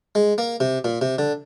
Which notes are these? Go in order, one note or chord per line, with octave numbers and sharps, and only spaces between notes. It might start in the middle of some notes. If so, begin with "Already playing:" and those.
G#3
A#3
C3
A#2
C3
D3